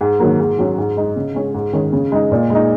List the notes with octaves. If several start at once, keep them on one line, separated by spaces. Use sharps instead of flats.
G#2
D#3 F#3 A#3
G#2
F#3 C#4
G#2
G#3 D#4
C#3
G#3 C#4
G#2
D#3 G#3 C#4
C#3
G#3 D#4
A#2
G#3 D#4